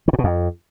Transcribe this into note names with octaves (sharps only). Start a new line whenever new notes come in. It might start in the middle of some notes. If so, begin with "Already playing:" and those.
D#3
A2
B2
F2